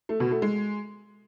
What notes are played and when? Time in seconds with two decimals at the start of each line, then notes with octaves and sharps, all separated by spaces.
0.09 A3
0.20 B2
0.31 A3
0.42 G#3